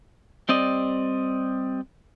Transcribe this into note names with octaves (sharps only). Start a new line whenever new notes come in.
G3 C4 D5 D#5